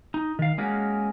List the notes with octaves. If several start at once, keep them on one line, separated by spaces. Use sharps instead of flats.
D#4
D#3 F5
G#3 A#3 C#4 F#4